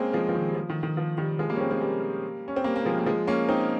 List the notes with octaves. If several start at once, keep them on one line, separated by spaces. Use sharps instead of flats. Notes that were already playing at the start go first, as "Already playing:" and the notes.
Already playing: G#3 A#3 C4 C#4
F3 G#3
F3
D#3
G3
F3
D#3
D#3
F3
D#3 G3
F3 G#3
G3 A#3
C#4
G#3 C4
G#3 C4
G3 A#3
C#4
C4
G3 A#3
A#3
F3 G#3
A#3
F3 G#3
A#3 C#4
C4 D#4